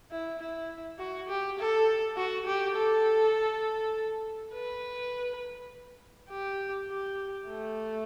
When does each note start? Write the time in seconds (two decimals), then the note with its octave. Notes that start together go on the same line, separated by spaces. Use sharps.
0.11 E4
0.39 E4
0.99 F#4
1.29 G4
1.58 A4
2.17 F#4
2.46 G4
2.75 A4
4.53 B4
6.30 G4
6.89 G4
7.47 A3